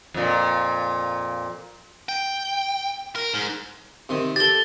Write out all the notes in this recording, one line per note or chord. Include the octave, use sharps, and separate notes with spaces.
F2 A#2
G5
A#4
G#2
C3 D#3
G4 A4 A6 G7